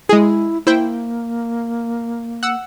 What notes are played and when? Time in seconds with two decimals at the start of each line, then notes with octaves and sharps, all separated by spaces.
0.09 G#3 E4 G#4
0.67 A#3 E4 C5 G5
2.43 F#5 E6